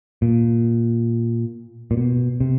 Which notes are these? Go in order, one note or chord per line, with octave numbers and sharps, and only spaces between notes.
A#2
A#2
B2
C3